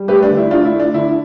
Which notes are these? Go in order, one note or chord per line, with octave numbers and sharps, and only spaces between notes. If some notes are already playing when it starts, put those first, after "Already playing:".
Already playing: G3
A3 G4 B4
D4
D3
E4
A3 D4 F4
E4
A3
D4
D3 E4